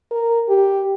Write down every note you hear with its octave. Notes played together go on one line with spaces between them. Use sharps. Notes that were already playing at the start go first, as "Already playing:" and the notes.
A#4
G4